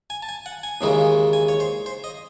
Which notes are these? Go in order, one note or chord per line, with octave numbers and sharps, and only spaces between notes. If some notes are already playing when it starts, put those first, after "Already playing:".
G#5
A5
G#5
F#5
G#5
D#2 C#3 E3 G#3 D#4
G#5
C#5
C5
C5
D#5